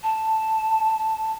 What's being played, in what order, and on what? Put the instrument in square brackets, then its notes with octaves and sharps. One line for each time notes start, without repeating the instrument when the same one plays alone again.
[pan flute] A5